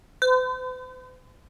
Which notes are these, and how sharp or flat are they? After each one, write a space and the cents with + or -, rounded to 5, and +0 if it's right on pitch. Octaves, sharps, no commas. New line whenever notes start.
C5 -45